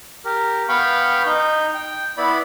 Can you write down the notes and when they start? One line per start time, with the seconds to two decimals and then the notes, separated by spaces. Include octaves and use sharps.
0.25 G4 A#4
0.69 B3 F5 G5 B5 C#6
1.26 D#4 G6
1.74 G5
2.18 B3 E4 D5 B5